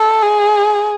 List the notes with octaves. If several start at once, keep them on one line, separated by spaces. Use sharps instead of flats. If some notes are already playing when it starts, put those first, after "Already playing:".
Already playing: A4
G#4